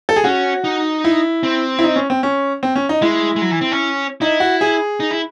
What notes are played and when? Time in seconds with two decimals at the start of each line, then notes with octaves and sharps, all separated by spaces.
0.09 A4
0.16 G#4
0.24 C#4 F#4
0.64 D#4
1.04 E4
1.43 C4
1.79 E4
1.84 D#4
1.96 C#4
2.10 C4
2.23 C#4
2.63 C4
2.76 C#4
2.89 D#4
3.02 G#3 E4
3.36 G#3
3.42 F#3
3.51 E3
3.61 C4
3.72 C#4
4.21 D#4 E4
4.40 F#4
4.61 G#4
5.00 D#4
5.11 E4